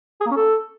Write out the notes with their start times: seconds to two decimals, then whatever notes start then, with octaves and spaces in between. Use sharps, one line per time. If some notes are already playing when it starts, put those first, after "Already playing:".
0.21 G#4
0.26 A#3
0.31 C#4
0.37 A4